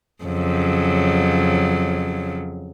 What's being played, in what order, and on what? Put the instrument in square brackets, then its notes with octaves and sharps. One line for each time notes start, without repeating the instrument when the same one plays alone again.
[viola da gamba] F2 C#3 F#3